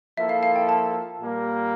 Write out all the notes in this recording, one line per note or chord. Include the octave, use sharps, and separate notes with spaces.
F3 A#3 E4 A4 E5
F5
F5
G5
A5
A#2 G3 A#3